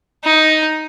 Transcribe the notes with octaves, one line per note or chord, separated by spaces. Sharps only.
D#4